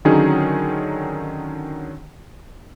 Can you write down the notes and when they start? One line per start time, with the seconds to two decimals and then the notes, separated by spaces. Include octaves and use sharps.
0.05 D3 D#3 F#3 C#4 D#4 G#4